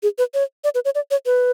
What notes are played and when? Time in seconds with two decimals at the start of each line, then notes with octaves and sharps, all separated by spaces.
0.03 G#4
0.18 B4
0.34 C#5
0.64 D5
0.75 B4
0.85 C#5
0.95 D5
1.11 C#5
1.26 B4